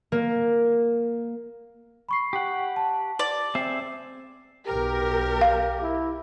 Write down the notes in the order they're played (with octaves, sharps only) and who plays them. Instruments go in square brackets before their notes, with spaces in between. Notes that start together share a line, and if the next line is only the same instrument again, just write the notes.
[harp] A#3
[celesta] B5 C#6 C7
[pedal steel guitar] G4 F#5
[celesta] A5
[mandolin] D5
[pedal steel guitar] C4 G#4 E5 [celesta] C7
[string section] B1 A#4 [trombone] G4
[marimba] F5
[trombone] E4